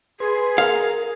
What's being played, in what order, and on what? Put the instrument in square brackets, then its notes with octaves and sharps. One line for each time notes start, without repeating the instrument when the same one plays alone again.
[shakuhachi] G#4 [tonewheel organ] B4 G#5 C6
[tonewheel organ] A#4 [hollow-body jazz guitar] F5